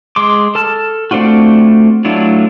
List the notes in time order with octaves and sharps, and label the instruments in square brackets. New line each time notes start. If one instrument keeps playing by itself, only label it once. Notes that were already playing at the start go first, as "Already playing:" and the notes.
[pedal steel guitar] G#3 C6 D6
A4 A5 F6
A3 C4 D4 F4 F#4
F#3 A3 D4 E4 F4